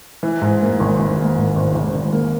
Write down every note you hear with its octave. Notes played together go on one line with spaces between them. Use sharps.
E3
G#2
A#3
G#1
G#1
A#3
G#2
G#1
G#1
G#1
A#3